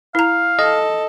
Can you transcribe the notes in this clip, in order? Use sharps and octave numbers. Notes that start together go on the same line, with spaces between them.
E4 F5 A#5
A4 D#5